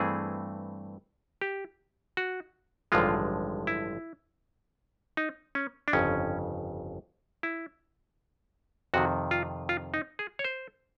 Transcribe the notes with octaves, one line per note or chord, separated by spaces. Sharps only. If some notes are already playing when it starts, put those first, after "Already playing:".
Already playing: G2 E3 A3 C4 G#4
G4
F#4
A1 G2 D3 F3 G#3 F4
E4
D#4
C#4
D4
G1 F2 C#3 C#4
E4
F2 C3 D#3 F#4
F4
F4
D#4
G#4
C#5
C5